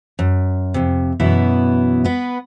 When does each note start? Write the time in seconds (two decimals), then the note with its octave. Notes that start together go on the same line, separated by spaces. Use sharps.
0.19 F#2
0.74 F2 C3
1.20 F#2 B2 E3 B3 E4
2.04 B3 B4